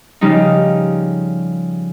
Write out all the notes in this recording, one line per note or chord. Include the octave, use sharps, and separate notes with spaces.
C#3 F3 G3 D#4